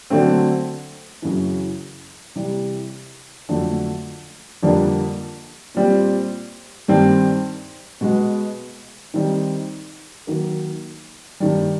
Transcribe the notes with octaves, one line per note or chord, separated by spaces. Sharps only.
D3 F#3 A3 C4
F#2 C#3 E3
C3 E3 G3
F2 D3 F#3 A3
F2 D3 G3 A#3 D4
A#2 G3 C4
G2 D#3 G3 C4
B2 G#3 B3
D#3 G3 C4 D#4
D#3 F#3 A#3
G2 D#3 G3